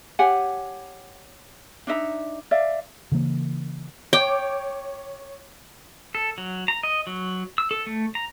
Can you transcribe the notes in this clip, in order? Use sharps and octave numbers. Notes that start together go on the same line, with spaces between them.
G4 C#5 F#5 G#5
D4 D#4 E5 A#5
D5 E5 F5
C#3 E3 A#3
C#5 G5 D6
A4
F#3
A#5
D#5
F#3
E6
A4
A3
A#5